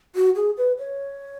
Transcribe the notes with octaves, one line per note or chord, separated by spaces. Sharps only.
F#4
G#4
B4
C#5